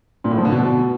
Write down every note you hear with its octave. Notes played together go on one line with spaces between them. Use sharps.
A#2
A2
F3
D3
B2